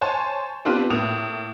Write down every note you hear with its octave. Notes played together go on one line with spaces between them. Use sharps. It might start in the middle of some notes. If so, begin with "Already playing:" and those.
C5 C#5 G#5 A5
B3 C4 D4 F4 G4 B4
A2 A#3 D#6 F7